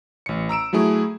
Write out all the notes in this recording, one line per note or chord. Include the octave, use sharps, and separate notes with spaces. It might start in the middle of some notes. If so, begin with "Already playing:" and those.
A1 C#7
A#5 E6 D7 E7
F#3 A3 E4 G#4